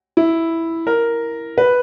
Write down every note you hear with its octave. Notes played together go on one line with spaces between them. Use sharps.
E4
A#4
B4